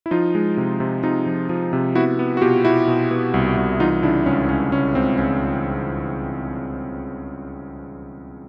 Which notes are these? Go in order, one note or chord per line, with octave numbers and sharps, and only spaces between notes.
E4
F3 D#4 F4
G#3
C3
C3
C3 D#4 F4
F3
F3
C3
B3 E4 F#4
B3
F#4
B2 F4 G4
B2 E4 F#4
B2
B3
C2
C2
E3 D#4 F4
C#3 D4 E4
C#2 C#4
C#2 C#4
C#2 C#4
C#2 C4
C#2 C#4